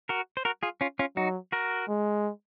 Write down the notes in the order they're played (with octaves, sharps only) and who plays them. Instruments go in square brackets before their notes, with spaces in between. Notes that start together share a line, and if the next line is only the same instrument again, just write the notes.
[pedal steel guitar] F#4 A#4
C5
F#4 A#4
F4 G#4
C#4 F4
C#4 F4
[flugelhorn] F#3 [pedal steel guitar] D#4 F#4
[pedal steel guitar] F#4 A#4
[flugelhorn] G#3